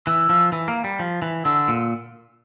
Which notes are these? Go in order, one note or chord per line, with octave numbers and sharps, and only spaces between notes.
E3 E6
F3
E3
A#3
G3
F3
E3
D3 E6
A#2